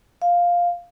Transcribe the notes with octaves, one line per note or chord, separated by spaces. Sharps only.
F5